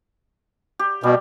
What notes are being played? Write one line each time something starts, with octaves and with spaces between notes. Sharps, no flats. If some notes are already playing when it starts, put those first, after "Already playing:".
G4
B2 G3